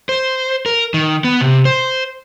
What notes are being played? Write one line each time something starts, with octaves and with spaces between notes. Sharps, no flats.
C5
A#4
D#3
B3
C3
C5